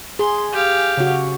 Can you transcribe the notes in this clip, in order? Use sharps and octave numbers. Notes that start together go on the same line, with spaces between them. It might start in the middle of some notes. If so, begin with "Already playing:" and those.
G#4 C6
G4 F5
C#3 F#4